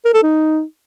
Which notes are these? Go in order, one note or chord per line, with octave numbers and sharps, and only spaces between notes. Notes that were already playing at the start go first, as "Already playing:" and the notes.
A#4
A4
D#4